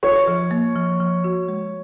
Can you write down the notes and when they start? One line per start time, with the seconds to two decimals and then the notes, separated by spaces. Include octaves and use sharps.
0.03 F4 C#5
0.28 F3
0.51 A#3
0.76 F3
1.00 F3
1.24 F#4
1.48 G#3